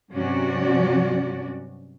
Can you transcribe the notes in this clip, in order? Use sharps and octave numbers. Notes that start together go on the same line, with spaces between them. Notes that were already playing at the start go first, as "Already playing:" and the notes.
G2 C3 F#3 C#4 F#4 D5